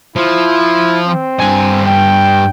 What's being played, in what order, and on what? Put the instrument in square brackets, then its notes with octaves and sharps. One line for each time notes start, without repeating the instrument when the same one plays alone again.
[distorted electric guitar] F3 [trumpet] E4
[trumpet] C4
[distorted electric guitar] G2 G#5
[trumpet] G5